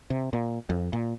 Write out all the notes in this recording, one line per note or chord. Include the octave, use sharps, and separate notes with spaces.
C3
A#2
F2
A#2